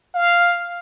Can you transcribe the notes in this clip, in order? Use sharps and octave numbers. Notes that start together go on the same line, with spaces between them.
F5